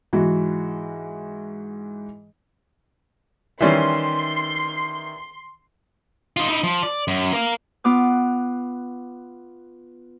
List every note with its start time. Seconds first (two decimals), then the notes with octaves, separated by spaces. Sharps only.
0.13 G#2 E3 F#4
3.61 D#3 E3 G3 C#4 E5 C6
6.37 D#4 F4
6.49 D#4 E4
6.64 F3
6.83 D5
7.08 F#2
7.33 A#4 F5
7.84 B3 F4 D6 F#6